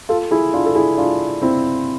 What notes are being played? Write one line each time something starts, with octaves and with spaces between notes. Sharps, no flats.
F4 A4
E4 G#4
D4 F4
A4
E4 G#4
D4 F4
C4 E4